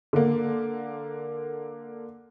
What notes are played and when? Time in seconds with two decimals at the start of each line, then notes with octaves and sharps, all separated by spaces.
0.13 D3 A#3